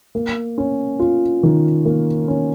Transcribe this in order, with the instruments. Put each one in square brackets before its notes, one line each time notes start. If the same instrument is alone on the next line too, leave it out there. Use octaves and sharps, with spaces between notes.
[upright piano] A#3
C#4
F4
D#3
A#3
C#4